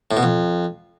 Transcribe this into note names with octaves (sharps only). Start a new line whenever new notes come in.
A2
B2
F2